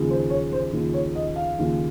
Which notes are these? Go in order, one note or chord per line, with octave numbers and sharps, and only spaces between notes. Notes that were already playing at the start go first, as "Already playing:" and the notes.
Already playing: D#2 C#3 F3
C5
C#5
C5
D#2 C#3 F3
C#5
D#5
F5
D#2 C#3 F3